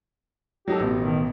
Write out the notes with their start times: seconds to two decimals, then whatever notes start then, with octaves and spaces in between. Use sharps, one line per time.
0.68 F#3 D#4 G4 A4
0.80 A1 B2
1.01 D#3